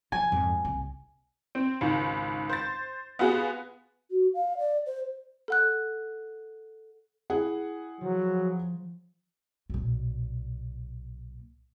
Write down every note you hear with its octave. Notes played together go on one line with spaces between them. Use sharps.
F3 G#5
F2 G#2
C2
C4
G#1 C#2 D#3
C5 A6
B3 F4 F#4 G#4
F#4
F5
D5
C5
A4 F#5 F#6
E4 G#4 F#5
F3 F#3
B1 A#2